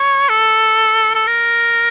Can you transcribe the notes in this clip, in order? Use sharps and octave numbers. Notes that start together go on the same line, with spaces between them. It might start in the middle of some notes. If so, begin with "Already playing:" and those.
Already playing: C#5
A4
A4
A#4